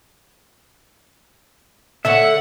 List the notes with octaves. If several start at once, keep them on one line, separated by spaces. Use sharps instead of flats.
D3 A4 C#5 E5 F#5